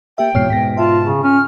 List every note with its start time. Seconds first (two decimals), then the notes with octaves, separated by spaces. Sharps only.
0.18 A#3 G4 E5 G5
0.35 E2 G#2 B2 C#5 F6 C7
0.50 G#2 B2 A#6 B6
0.77 F4 E5 A5
1.04 C#3
1.23 C#4 F6